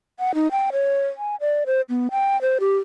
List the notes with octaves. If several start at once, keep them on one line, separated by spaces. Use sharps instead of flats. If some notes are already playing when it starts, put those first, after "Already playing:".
F#5
D#4
G5
C#5
G#5
D5
C5
B3
G5
C5
G4